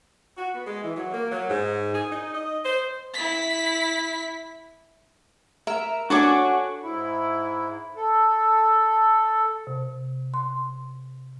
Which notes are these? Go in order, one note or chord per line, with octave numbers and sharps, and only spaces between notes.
F#4
B3
G#3
E3
F#3
A#3
F#3
G#2
G#4
D#4
D#5
C5
E4 B6
A#4 E5
D4 F#4 A4 C#5 G#5 D6 D7
G#2 E4
A4
C3
C6